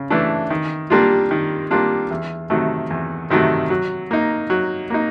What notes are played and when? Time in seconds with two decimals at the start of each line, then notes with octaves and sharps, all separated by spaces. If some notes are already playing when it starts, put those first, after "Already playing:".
Already playing: C#3
0.10 E3 A3 D4
0.50 D#3
0.90 G3 A#3 D4 F4
1.31 D#3
1.71 G3 A#3 D4 F4
2.11 E2
2.50 C3 D#3 F#3 A3
2.91 E2
3.30 C3 D#3 F#3 A3
3.70 F#3
4.11 A#3 D#4
4.50 F#3
4.90 A#3 D#4